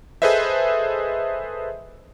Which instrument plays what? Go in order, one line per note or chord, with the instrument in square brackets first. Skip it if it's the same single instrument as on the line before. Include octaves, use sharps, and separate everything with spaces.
[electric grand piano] G#4 A4 B4 C5 D#5 E5